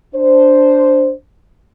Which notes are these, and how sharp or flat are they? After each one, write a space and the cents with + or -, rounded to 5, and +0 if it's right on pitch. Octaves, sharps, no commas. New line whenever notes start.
D4 -5 C5 +0